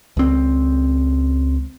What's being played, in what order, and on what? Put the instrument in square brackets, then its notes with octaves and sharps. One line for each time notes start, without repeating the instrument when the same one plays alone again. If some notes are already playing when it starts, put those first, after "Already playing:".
[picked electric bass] C#2 C4